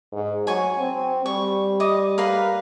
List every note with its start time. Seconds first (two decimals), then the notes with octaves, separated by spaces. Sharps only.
0.12 G#2
0.47 F#3 G#5 C#6
0.79 C4
1.26 G3 C#6
1.80 D#5 D6
2.18 A#4 B4 F5